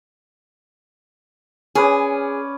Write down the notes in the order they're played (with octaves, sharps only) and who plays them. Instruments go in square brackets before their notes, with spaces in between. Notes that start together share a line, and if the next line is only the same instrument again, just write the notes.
[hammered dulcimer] C#4 B4 D5 [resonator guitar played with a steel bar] G#4